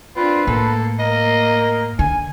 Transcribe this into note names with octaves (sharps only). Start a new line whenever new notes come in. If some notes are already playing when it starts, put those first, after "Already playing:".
C4 D4 F4 B4
A2 A#3 A4
A#3 A#4 D#5
D3 G#5